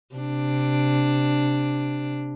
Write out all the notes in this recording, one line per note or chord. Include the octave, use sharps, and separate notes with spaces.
C3 D4